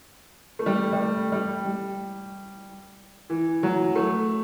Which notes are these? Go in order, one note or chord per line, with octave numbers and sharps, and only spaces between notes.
A3
G3
G3
A3
G3
G3
E3
F#3
A3